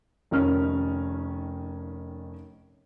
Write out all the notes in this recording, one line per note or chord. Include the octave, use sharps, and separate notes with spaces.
F1 D#3 C#4 F6